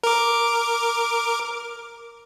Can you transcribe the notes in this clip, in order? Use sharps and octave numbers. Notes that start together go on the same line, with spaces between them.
A#4 D6